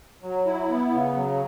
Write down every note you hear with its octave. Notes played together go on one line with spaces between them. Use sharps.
F#3
E4
B3
C#3
F#3